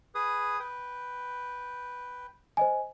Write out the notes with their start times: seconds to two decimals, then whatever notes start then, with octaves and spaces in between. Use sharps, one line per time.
0.15 G#4 B4 D#6
0.59 B4 G5
2.57 C5 D#5 G#5